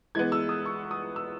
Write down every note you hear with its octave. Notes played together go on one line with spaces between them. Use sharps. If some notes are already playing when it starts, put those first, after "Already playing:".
E3 G#3 B3 G#6
E6
D#6
C#6
D#6
E6